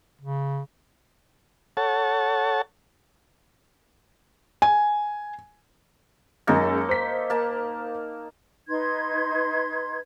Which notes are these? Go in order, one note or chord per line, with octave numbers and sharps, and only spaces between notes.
C#3
A4 C#5 F#5 A5
G#5
F#2 G#3 A#3 D#4 A4 A#6
C5 B6
A#3 A5
D#4 B4 C6 G#6